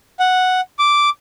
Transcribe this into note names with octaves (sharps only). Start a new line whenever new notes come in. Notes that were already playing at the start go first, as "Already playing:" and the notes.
F#5
D6